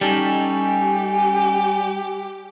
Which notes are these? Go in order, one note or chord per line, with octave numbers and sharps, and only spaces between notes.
G3 C#4 D#4 G4 A4 G#5